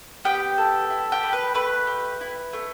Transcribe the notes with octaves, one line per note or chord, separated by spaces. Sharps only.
B3 G4 G5
A4
E4
G4 G5
B3
B4
A3 B4
G4
E4
A3